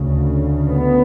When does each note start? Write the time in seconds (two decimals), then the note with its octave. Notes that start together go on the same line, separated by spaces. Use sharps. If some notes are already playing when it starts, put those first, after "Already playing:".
Already playing: D2 C#3
0.68 B3